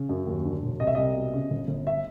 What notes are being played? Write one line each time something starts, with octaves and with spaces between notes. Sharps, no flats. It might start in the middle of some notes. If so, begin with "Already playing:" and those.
Already playing: C#3
F#2
D#2
D3
E1
C2 D#5
E5
C2 D#5
B2
C#3
G1
G1
E5